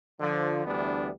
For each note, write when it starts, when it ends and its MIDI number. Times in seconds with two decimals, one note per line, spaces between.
0.21 0.64 50
0.21 0.64 53
0.66 1.09 38
0.66 1.09 52
0.66 1.09 55
0.66 1.09 59
0.66 1.09 62